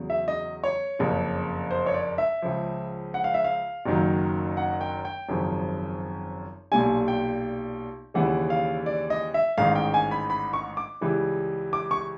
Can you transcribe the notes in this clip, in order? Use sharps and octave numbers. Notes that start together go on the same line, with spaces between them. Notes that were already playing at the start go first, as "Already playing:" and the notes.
Already playing: E2 C#3 F#3
E5
D#5
C#5
F#1 F2 C#3
C5
C#5
D5
E5
C#2 C#3 F3
F#5
F5
E5
F5
F#1 F#2 D#3 F#3
F#5
G5
G5
G#1 F#2 C#3 F3
B1 A#2 G3 G#5
G5
D#2 C#3 E3 G3 F#5
F5
D5
D#5
E5
A1 G#2 D#3 F5
G5
G#5
B5
B5
C#6
D6
C#2 C#3 E3 G3
D6
C#6